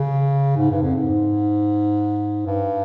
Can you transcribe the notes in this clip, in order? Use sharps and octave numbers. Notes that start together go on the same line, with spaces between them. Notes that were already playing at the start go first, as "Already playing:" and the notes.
Already playing: C#3
G#2
G2
F2
G#2
G2